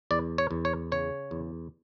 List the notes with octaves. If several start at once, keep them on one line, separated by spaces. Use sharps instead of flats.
E2 D5
C#5
E2
C#5
C#3 C#5
E2